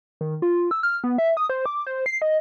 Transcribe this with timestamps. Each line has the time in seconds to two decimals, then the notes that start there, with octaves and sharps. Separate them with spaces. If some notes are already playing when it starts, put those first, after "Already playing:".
0.21 D#3
0.42 F4
0.71 E6
0.83 F6
1.04 B3
1.18 E5
1.37 D#6
1.49 C5
1.66 D6
1.87 C5
2.06 C7
2.22 D#5